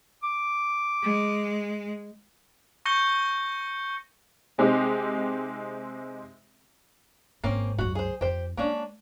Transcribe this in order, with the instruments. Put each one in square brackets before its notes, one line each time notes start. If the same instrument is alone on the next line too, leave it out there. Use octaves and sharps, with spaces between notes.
[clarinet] D6
[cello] G#3
[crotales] C#6 G6 A#6 C#7 G7
[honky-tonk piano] C3 G#3 C4 D#4 G4
[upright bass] G#1 G#2 [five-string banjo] A#3 C4 C#4
[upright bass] C#2 F#2 [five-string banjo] F#4
[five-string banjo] G#4 C5
[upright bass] F2 [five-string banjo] G4 C5
[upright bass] G#3 [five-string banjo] A#3 C#4 D4